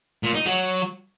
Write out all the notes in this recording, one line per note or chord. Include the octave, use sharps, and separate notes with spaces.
A#2
D#4
F#3